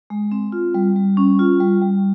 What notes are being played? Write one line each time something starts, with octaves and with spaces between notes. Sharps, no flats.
G#3
C4
F4
G3
G3
C#4
F4
G3
G3